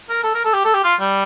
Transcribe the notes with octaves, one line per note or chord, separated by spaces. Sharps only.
A#4
A4
A#4
A4
G4
A4
G4
F4
G3